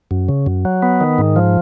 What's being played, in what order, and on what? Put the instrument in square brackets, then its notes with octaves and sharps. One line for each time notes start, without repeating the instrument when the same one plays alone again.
[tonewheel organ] F#2
C#3
F#2
F#3
B3
D#3
G#2
F3